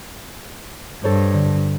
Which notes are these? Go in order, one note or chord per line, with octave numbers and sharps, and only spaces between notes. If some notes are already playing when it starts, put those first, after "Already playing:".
G2 A4 C5 C#5
D3